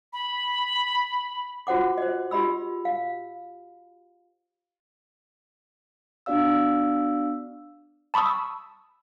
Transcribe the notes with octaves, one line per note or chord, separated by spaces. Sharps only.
B5
F4 F#4 C5 F#5 D6
C5 D#5
F4 G4 D#5 B5 E6
F5
B3 D4 F#4 D5 F5 E6
A5 B5 C#6 D#6 E6